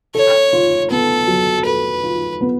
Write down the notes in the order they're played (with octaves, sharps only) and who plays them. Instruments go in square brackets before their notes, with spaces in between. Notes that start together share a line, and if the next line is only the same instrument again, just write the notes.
[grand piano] A4 [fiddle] C#5
[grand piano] F4
[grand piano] B3 [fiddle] A4
[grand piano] F#3
[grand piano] A4 [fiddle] B4
[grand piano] F4
B3